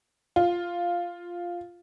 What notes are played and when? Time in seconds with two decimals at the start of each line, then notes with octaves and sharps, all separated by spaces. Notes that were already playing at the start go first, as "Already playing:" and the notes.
0.36 F4